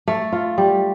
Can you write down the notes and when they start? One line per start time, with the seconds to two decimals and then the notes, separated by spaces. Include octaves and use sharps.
0.08 A3
0.33 F4
0.58 G3